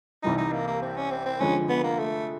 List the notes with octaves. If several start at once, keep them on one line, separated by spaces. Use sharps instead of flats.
C2 C3 E3 G3 D#4
D#4
A#3
A#3
C4
C#4
C4
C4
F2 D3 F3 G#3 C#4
B3
A#3
A3